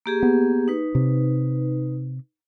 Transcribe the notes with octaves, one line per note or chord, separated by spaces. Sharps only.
A#3 G4 G#4
B3
D#4 B4
C3